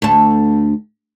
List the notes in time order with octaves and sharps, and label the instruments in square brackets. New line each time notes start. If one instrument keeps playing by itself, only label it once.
[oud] D2 A4